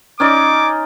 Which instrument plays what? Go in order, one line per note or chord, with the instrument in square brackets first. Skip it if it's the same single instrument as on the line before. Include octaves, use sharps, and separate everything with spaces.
[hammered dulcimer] C#4 D#4 D5 [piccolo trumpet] D6